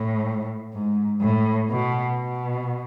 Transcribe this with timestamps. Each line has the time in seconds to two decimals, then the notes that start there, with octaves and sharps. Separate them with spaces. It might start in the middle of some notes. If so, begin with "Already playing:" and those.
Already playing: A2
0.74 G#2
1.21 A2
1.70 B2
2.17 B2